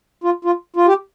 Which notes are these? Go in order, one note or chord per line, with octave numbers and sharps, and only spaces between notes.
F4
F4
F4
G4